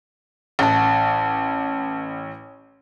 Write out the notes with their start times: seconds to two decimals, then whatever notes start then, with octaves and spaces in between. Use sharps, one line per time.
0.59 A1 F#5 A5